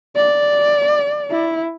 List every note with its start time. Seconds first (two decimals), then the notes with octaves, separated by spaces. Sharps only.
0.15 D5
1.31 E4